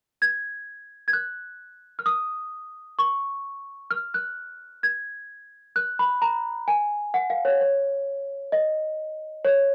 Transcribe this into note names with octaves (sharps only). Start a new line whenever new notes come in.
G#6
G#6
F#6
F6
D#6
C#6
F6
F#6
G#6
F#6
B5
A#5
G#5
F#5
F5
C#5
C#5
D#5
C#5